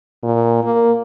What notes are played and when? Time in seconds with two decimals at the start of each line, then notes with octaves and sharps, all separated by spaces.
0.23 A#2
0.63 A#3